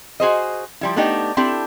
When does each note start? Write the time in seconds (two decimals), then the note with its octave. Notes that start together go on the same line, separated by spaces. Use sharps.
0.20 F#4 G#4 C5 D#5
0.81 F3 G3 E4
0.96 A3 B3 D4 D#4 G4
1.37 C4 D4 E4 G4 A4